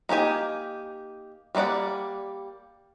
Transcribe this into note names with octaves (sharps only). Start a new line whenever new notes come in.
A#3 D#4 G4 G#5
G3 A#3 F4 D5 F#5